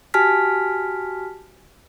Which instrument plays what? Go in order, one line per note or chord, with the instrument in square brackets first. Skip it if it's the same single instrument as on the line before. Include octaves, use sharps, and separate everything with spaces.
[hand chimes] F#4 G4 G#5 A5 F6 B6